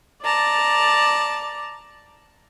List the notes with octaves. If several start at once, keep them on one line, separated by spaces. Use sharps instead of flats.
D5 A5 A#5